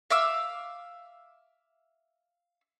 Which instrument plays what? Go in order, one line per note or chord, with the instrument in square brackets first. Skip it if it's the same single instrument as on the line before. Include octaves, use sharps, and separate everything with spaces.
[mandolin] E5 F5 D6 E6